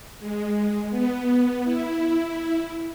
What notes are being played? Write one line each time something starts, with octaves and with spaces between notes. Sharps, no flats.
G#3
B3
E4